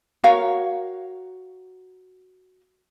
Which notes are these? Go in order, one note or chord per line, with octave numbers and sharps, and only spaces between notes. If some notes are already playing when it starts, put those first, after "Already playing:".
F#4 A#4 C#5 F5